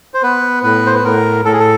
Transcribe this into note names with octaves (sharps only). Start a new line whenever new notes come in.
C5
B3 B4
A2 B4
C5
B4
A2 A#4
A2 A4
G#4
A4